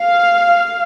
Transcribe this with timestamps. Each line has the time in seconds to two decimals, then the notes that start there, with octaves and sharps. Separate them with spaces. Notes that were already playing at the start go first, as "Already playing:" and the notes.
Already playing: F5